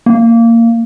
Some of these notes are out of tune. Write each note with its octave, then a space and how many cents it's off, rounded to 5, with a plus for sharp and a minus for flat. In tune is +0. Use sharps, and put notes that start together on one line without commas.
A#3 -20